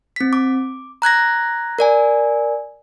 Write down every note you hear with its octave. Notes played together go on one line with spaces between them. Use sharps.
C4 B6
D6
A#5 F#6 G#6 A#6
A#4 D5 G#5